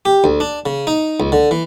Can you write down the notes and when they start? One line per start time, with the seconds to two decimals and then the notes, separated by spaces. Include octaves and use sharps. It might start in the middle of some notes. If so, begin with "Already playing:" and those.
0.05 G4
0.24 D2
0.40 D4
0.66 C#3
0.87 D#4
1.20 C#2
1.32 D3
1.51 E3